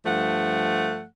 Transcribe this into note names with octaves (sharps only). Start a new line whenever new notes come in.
G2 F3 A3 F#5